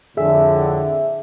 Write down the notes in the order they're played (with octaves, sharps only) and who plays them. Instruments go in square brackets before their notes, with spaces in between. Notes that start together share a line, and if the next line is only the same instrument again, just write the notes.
[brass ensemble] F2 A2 D3 [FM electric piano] G#4 E5